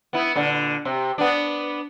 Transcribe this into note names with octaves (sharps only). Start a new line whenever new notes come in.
B3 E4
A#2 D3
C3
B3 D4